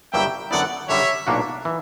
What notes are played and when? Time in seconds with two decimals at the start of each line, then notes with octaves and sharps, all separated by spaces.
0.13 G1 G2 F#3 A#3 E4 E5 G5
0.51 F#2 D3 F#3 B3 E4 D5 F#5
0.89 F#2 D3 G3 C#5 E5
1.27 B1 A#2 A#3 D4 F#4
1.65 E3